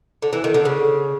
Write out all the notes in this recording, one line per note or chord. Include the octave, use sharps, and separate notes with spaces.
D3
E3
D#3
D3
C#3